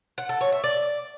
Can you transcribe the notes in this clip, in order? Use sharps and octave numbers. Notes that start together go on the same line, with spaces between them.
F#5
A4
C#5
E5
D5